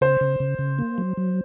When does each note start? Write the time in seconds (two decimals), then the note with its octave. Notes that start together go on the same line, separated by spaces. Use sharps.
0.01 C#3 C5
0.21 C#3
0.40 C#3
0.59 C#3
0.79 A#3
0.98 F#3
1.17 F#3